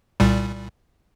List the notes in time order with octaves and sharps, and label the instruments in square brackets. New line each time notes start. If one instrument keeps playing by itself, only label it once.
[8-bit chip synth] C2 A#2 G3